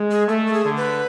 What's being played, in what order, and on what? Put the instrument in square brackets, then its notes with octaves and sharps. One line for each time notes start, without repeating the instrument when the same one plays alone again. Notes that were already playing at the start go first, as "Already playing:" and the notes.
Already playing: [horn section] G#3
[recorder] G#4
[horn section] A3 [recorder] A4
[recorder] A4
G#4
[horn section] D3
[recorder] B4